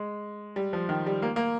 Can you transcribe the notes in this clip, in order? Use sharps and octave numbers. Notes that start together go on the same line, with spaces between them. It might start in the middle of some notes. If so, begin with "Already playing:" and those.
Already playing: G#3
G3
F3
D#3
G3
A#3
A#3